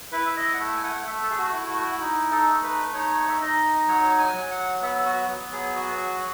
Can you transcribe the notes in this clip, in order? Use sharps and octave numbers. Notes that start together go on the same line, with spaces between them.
E4 B4
E5
D#5
F#5
A3 E5
G#5
F#5
A3 E5
A4
G#4
F#4
E4
F#4
D#4
A4
A3
B4
D#4 C#5
E5
D#4 D#5
F#3 C#5
G#5
F#3
F#5
B3 E5
F#4
F#3
G#4
F#4